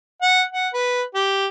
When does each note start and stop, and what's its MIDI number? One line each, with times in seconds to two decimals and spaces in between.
0.22 0.43 78
0.52 0.68 78
0.73 1.02 71
1.15 1.46 67